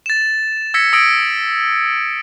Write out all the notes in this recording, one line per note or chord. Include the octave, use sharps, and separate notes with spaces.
A6 E7
E6 G#6 A#6 B6 C#7
D#6 E6 G#6 A#6 D7